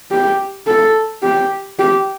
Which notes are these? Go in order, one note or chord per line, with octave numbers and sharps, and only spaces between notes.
G4
A4
G4
G4